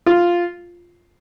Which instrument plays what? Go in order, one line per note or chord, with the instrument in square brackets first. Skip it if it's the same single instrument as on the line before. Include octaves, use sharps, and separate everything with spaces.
[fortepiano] F4